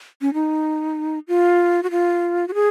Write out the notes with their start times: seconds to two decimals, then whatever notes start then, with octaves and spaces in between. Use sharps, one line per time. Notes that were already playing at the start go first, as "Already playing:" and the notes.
0.22 C#4
0.34 D#4
1.28 F4
1.83 F#4
1.91 F4
2.48 F#4
2.54 G#4